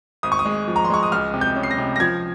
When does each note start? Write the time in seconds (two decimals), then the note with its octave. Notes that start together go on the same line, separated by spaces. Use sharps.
0.23 G#1 D#6
0.32 C#6
0.39 D#6
0.45 G#3
0.68 F3
0.76 A#5
0.84 C6
0.90 G#3 C#6
1.03 D#6
1.12 C#2 F6
1.34 C3
1.41 G6
1.56 C#4
1.63 C7
1.71 A#6
1.78 C3
1.96 A#6
2.00 F3 G#6